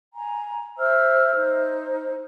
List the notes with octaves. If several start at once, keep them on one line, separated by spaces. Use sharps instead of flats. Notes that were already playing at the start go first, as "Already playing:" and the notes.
G#5 A#5
C5 E5 E6 F6
D#4 C5